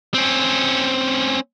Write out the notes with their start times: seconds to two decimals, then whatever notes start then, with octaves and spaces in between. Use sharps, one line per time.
0.14 C4 C#4